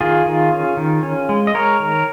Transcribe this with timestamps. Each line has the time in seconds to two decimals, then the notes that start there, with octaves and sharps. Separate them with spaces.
0.01 D#3 F4 G#4
0.26 D#3
0.52 C#4
0.77 D#3
1.03 C#4
1.29 G#3
1.47 D#5
1.54 G#3 A#4 C#5
1.80 D#3